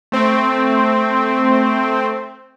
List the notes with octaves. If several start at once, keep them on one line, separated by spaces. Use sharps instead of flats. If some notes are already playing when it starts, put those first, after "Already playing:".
A3 C4